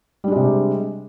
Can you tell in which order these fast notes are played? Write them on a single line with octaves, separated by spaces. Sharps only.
G3 D4 G#3 C3